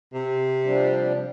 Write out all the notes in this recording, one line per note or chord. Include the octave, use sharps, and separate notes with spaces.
C3
F3 G3 D4